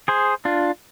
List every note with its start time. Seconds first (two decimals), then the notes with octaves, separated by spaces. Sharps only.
0.08 G#4 C5
0.45 D4 F4